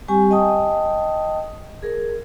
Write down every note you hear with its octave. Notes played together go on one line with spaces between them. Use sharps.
G3 C4 G4 G#5 C#6
D#5 G5 A5 D#6
G#4 A#4